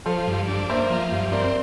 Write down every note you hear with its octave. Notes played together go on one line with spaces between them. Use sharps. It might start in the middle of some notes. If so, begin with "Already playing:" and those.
F3 A4 C5
G2
D4
A#3 C5 E5
F3
G2
C4 A#4 D5